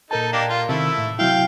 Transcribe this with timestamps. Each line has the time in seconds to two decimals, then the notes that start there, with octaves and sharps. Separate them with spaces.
0.11 A#2 D#4 A4 A#4 A5
0.33 A#3 D4 G4
0.49 F4
0.69 C3 D#3 A3 E4
0.98 A2
1.19 C3 F#3 E4 F5 G5